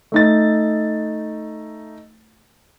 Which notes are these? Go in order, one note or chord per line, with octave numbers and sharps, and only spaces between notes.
A3 D#4 A6